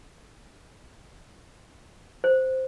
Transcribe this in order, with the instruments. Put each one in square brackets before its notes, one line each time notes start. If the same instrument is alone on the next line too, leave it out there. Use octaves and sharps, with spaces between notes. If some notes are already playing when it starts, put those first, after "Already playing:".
[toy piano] C5